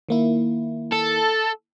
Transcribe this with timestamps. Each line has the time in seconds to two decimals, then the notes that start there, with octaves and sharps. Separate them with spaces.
0.09 D#3 A#3 E4
0.93 A4